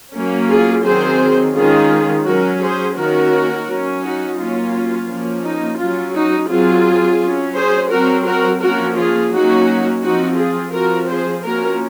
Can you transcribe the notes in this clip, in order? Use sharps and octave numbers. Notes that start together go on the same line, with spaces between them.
F#3 A#3 C#4
F4 G#4
D#3 F#3 C4 G#4 C5
D#3 G#3 C#4 F4 G#4
F#3 C#4 F#4 A#4
G#4 C5
D#3 A#3 C#4 F#4 A#4
F#3 C#4
D#4 F#4
F#3 A#3 C#4 F4
F3 A#3 C#4
D#4
F#3 C#4 F4
D#4 F#4
F#3 C4 F4 G#4
F#3 C#4
G#4 C5
F#3 C4 F#4 A#4
F#4 A#4
F3 A#3 C#4 F#4 A#4
F4 G#4
F#3 A#3 C#4 D#4 F#4
F3 C4 D#4 F#4
F4 G#4
F3 C4 F#4 A#4
G#4 C5
F3 A#3 C#4 F#4 A#4